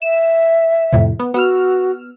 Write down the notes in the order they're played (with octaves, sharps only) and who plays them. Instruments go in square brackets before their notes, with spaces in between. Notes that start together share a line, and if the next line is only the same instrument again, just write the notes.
[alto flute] E5 [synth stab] E7
[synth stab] F2 A2 C3
B3
[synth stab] B3 E6 F6 [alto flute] F#4